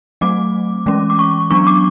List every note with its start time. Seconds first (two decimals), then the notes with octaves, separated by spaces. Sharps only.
0.21 F#3 A3 C4 D6
0.86 E3 G#3 C#4
1.10 D6
1.19 C#6
1.50 F#3 B3 D4 C#6
1.67 D6